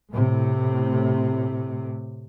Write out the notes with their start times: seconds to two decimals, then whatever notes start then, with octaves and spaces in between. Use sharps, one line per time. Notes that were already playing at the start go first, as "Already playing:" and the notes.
0.10 A2 C3